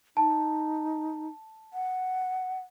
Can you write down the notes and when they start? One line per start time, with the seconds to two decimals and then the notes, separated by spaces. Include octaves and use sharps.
0.17 D#4 A5
1.73 F#5